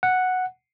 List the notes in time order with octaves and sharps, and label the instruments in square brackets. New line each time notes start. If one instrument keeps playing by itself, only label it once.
[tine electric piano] F#5